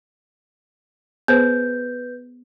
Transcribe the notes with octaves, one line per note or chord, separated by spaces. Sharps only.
B3 G#4 B4 C5 G6